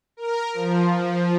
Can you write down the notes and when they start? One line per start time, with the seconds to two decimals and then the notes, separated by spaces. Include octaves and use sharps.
0.17 A#4
0.54 F3